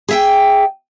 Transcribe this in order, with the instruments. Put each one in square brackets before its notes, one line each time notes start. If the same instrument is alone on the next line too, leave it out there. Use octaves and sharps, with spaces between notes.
[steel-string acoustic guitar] G#4 E5 G5